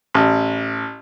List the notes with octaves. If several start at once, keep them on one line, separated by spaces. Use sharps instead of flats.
A1